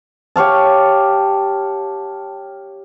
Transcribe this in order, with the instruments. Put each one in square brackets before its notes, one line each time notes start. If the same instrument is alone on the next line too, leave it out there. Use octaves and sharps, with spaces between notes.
[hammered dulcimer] G4 C#5 F5 A5